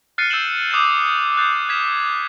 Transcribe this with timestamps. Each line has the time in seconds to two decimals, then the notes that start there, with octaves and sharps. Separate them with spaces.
0.18 F6 F#6 A6 C7 C#7 D#7
0.30 E6 G6 C7 D7 E7 F#7
0.71 D6 D#6 F#6 G6 A6 E7
1.37 F#6 G6 A6 C7
1.68 F6 F#6 G#6 B6 E7 F7